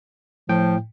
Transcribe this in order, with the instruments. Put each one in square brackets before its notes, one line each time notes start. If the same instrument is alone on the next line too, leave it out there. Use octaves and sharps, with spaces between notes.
[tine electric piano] A2 G5 [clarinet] F3